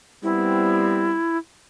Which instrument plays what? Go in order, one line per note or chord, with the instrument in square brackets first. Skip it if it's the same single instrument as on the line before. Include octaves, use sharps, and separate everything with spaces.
[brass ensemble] G3 B3 C4 [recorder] E4